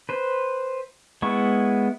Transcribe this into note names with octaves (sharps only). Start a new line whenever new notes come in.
B4 C5
G#3 B3 E4 C#6